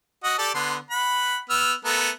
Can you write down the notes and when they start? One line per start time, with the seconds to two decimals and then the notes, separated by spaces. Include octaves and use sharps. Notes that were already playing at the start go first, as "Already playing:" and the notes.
0.24 F#4 D#5 F#5
0.38 G4 A4 D5
0.55 D3 B3 C6
0.90 F#5 B5
1.50 B3 E6 F6
1.85 A3 B3 A#4